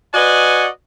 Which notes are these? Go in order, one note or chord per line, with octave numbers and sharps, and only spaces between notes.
F#4 B4 D5 D#5 F#5 G#5